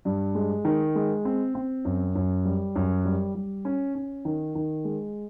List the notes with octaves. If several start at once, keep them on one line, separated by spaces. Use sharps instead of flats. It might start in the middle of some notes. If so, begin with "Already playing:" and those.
G2
G#3
D#3
G#3
C4
C4
F#2
F#2
G3
F#2
G3
G3
C#4
C#4
D#3
D#3
G#3